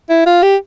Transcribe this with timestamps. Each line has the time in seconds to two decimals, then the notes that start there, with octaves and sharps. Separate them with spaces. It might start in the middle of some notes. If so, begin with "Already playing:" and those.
0.10 E4
0.26 F4
0.43 G4